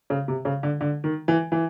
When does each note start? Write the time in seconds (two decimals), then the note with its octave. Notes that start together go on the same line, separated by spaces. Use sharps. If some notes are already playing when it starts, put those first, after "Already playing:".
0.10 C#3
0.28 C3
0.45 C#3
0.63 D3
0.81 D3
1.04 D#3
1.28 E3
1.52 E3